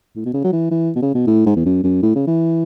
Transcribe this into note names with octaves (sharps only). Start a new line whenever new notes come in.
A2
B2
C#3
F#3
E3
E3
B2
C#3
B2
A2
G#2
E2
F#2
F#2
A2
C#3
E3